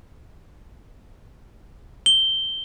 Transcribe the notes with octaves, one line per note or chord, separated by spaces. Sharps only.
G7